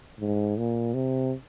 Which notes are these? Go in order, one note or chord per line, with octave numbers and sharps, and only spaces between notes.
G#2
A#2
C3